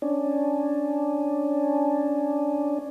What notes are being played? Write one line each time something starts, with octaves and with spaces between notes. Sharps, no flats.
C#4 D4